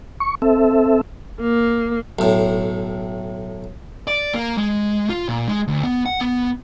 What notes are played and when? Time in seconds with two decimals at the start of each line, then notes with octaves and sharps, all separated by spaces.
0.20 C#6
0.42 C4 A4 E5
1.41 A#3
2.19 B1 A2
4.07 D5
4.34 A#3
4.57 G#3
5.09 F4
5.28 A#2
5.47 G#3
5.68 D2
5.84 B3
6.06 F#5
6.21 B3